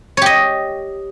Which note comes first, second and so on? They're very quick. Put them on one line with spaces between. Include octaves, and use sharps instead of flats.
C#5 G4 D#5